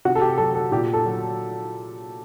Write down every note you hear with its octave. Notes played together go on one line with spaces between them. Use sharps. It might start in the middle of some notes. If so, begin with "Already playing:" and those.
C3 F#4
A4
G4
F#3 A4
A4
A#2 G4
A4
F#3